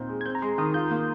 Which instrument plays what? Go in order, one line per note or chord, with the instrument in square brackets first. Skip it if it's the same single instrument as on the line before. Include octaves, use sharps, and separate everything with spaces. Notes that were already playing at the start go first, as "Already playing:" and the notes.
Already playing: [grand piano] A#2 C4 D#4 [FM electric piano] G6
[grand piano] G#3
[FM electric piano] G#6
[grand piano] C4 [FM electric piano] G6
[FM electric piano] A#5
[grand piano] G#3 [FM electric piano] C6
[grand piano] D#3 [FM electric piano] D#6
[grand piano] F4 [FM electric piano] G6
[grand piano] A#3